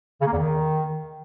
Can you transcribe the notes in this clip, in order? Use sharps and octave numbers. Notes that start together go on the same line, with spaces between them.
C#3
A#3
E2
D#3